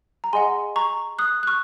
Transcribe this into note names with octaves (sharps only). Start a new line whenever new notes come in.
A#5
G#4 D#5 F#5 G#5 C6
A#5 C#6
D#6 F#6
F#6
C#6 F6